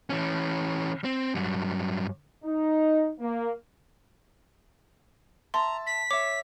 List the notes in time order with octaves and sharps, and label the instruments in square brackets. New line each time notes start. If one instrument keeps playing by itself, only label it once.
[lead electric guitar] E3 C#4
C4
G2 F#3
[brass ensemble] D#4
A#3
[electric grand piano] E5 A5 [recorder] A#5 [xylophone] C6
[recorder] B6
[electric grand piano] C#5 E5 [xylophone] D6